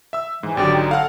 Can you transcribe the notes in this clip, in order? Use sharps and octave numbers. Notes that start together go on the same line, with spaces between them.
E5 E6
G#2 E3
G#1 D3 F#3 G4 D5 G5
D#4
A4 F5 F#5 F6